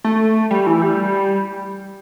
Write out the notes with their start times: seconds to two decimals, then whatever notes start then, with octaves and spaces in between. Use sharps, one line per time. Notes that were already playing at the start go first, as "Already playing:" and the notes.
0.04 A3
0.51 G3
0.67 E3
0.82 G3